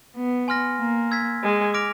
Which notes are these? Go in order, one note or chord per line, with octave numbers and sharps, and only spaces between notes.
B3
G#5 C6 F6 A#6
A#3
E6 G#6 B6
G#3
D6 F6 A#6 D7 F7